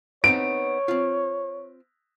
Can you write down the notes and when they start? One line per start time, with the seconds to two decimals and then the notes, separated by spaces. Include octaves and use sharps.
0.24 B3 C4 D#4 C#5 D7
0.88 C4 F4